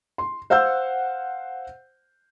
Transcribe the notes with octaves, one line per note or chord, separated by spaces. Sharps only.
C6
C5 F5 F#5 E6 G6